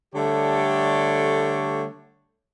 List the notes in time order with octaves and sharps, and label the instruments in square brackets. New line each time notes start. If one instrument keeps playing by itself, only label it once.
[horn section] D3 G3 A3 G4 C#5 A5